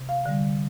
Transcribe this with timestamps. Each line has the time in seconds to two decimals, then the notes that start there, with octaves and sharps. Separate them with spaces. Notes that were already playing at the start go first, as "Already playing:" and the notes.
Already playing: C3
0.09 F5
0.26 D3 G3